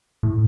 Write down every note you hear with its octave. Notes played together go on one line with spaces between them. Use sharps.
A2